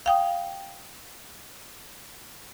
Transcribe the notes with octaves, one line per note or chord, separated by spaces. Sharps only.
F5 G5 D#6